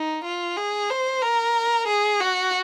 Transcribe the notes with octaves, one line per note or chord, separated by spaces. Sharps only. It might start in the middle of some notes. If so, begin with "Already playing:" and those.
Already playing: D#4
F4
G#4
C5
A#4
G#4
F#4